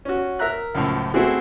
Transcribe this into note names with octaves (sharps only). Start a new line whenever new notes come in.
C#4 F#4
A#4 E5 A#5 F#6
C#2 F#2 A2 F3
A3 C4 E4 F#4 G#4